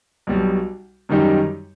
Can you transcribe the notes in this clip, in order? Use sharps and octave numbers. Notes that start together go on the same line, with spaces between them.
B1 B2 G3
F#2 D#3 G3 D#4 G4